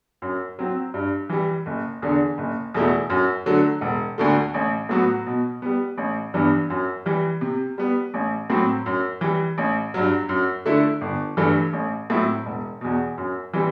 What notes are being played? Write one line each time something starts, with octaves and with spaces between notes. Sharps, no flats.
F#2
F#3 C4
G2
E3 G3
F#1
E2 D3
F#1
E2 B2 A3 E4
F#2
D3 F#3 A3
E1
D2 D3 A3
A1
A2 F#3 B3 F#4
B2
G3 B3
A1
G2 E3 B3 D4
F#2
E3 G3
C3
G3 B3
A1
A2 F#3 C4
F#2
E3 G3
A1
G2 F#3
F#2
D3 A3 E4
G1
G2 E3 A3
A1
A2 F#3 C4 E4
E1
E2 B2
F#2
E3 G3 C4